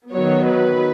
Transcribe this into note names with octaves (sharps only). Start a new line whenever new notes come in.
D#3 F#3 B3 C#5
B4